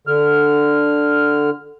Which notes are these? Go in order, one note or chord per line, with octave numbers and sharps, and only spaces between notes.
D3 F6